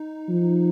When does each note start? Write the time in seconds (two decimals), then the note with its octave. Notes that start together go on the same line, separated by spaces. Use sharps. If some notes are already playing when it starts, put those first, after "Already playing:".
Already playing: D#4
0.29 F3